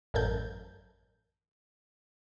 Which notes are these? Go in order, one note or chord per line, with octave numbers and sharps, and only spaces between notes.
A1 F#2 A4 A#4 G6